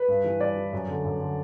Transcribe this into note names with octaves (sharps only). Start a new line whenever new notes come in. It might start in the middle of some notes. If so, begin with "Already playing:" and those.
Already playing: B4
G2
E3
G2 D5
E3
F#2
D3
F#2
D3